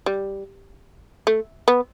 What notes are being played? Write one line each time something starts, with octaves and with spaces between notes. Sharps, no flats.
G3
A3
B3